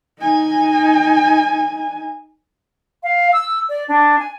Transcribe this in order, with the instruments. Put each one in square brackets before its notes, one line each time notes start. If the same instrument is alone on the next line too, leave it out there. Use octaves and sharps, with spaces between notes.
[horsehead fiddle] D#4 G#5
[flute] F5
E6
D5
D4
G#5